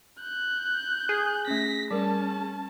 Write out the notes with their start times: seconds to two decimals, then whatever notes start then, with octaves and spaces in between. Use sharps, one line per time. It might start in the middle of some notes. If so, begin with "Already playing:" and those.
0.20 F#6 G6
1.09 G#4
1.47 A3 C#4 A#6 B6
1.91 G3 C#4 A#4 A5